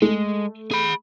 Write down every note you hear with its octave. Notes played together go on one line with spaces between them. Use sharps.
G#3 A3
G#4 B5